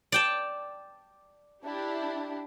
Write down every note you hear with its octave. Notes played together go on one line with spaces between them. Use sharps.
D5 G5 A5
D4 E4 G4